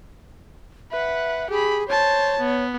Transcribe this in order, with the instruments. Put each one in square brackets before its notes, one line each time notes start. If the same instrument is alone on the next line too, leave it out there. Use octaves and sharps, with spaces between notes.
[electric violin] B4 F#5 [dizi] E5
[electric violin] G4 B5 [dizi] G#4
[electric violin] C5 A5 [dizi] C#5
[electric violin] B3